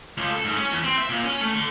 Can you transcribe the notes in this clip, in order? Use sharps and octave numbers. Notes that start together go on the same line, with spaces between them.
C#2
A4
G#2
C#4
E2
C4
E5
A#2
C#4
A3
D3